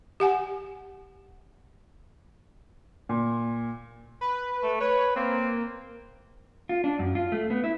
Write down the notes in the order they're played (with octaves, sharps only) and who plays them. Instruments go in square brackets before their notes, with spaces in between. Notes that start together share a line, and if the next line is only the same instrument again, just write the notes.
[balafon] G4 F#5 G#5
[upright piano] A#2
[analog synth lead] B4
[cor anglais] A3
[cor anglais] B4 [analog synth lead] C#5
[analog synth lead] A#3 [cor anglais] C4
[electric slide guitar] F4
D4
F#2
F4
A3
B3
E4